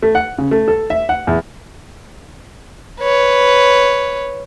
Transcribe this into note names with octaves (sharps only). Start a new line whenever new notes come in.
A3
F#5
C#3
A3
A4
E5
F#5
E2
B4 C#5